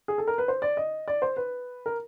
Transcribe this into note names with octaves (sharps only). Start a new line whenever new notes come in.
G#4
A4
A#4
B4
C5
D5
D#5
D5
C5
B4
A#4